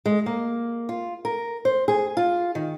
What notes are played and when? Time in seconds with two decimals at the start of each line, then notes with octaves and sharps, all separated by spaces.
0.06 G#3
0.26 A#3
0.89 F4
1.25 A#4
1.65 C5
1.88 G#4
2.17 F4
2.55 D#3